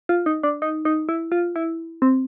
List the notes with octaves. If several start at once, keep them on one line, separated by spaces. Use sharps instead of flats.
F4
D#4
D4
D#4
D#4
E4
F4
E4
C4